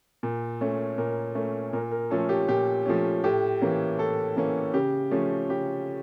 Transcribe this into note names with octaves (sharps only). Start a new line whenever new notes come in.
A#2
A3 C#4
A#2 A#4
A3 C#4
A#2 A#4
A#4
F3 A3 C#4 A4
G4
A#2 G4
F3 A3 C#4
A2 G4
E3 A#3 C#4
A2 A4
E3 A#3 C#4
C#3 G4
F3 A3 C#4
C#3 G4